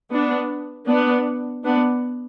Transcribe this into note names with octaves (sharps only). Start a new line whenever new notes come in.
B3 D4
B3 D4
B3 D4